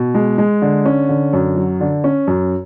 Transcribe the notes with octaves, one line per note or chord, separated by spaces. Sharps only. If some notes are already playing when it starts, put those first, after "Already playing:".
Already playing: B2
G#3
G#3
D3
C#4
D3
F#2
F#3
D3
C#4
F#2